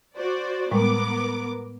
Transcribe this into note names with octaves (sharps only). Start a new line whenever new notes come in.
F#4 C5 D5
A2 G3 G#3 B3 A#4 D6